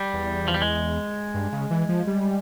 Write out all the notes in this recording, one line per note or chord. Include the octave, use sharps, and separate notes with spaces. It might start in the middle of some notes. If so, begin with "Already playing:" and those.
Already playing: G3
E2
F3
G3
G#3
G2
C#3
E3
F3
G3